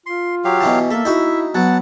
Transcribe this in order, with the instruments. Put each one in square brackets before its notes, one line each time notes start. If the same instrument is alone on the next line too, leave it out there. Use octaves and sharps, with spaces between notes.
[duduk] F4 [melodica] C6
[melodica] F#3 G4 F5
[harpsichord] B2 E3 A5
[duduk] A#3 [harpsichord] A4 [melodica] E5
[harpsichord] D#4 F#4 [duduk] E4
[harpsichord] F#3 [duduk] B3 [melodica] F#5 A5